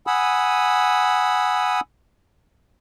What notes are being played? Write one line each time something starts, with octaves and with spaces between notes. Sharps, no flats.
F#5 G#5 B5 D#6 E6